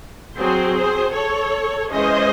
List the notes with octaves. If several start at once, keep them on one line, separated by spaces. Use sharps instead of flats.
F#3 C4 G#4 C5
G#4 C5
A4 C#5
E3 G#3 C#4 C5 D#5